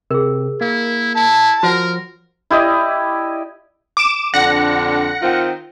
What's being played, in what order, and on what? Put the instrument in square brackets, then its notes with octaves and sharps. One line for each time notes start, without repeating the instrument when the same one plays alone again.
[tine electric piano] C3 [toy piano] G#4 A#4
[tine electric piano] A#3 [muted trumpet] E4
[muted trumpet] E4 [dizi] A5
[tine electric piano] F3 [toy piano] F#4 C#5 F#5 [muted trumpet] A#4
[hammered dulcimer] E4 G4 D5 D#5
[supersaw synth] D6 D7 E7
[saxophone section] F2 D3 D4 [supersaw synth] F#5 A#6 C#7
[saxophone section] D#3 C4 F4